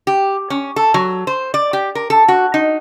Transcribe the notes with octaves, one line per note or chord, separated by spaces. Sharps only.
G4
C#4
A4
F#3
C5
D5
G4
A#4
A4
F#4
D#4